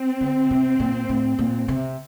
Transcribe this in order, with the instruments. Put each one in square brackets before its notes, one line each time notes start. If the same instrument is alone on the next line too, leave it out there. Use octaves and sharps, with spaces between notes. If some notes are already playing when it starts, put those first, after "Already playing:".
Already playing: [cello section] C4
[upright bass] D3
C3
A#2
A2
A#2
C3